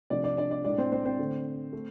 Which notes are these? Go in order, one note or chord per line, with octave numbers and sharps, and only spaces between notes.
C3 F3 A3 D4 D5
D4 D5
D4 D5
D4 D5
A2 G#3 D4 D5
C4 C5
C4 C5
C4 C5
D3 A3
A3